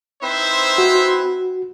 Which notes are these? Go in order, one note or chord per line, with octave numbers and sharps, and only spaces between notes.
C4 D#4 E4 B4 C5 E5
F#4